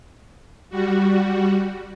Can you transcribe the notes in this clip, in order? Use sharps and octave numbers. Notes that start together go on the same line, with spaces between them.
G3 F#4